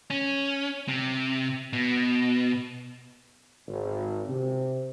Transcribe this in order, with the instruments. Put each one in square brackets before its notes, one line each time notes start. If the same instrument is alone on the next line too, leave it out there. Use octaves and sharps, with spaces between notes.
[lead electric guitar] C#4
C3
B2
[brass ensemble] G#1
C3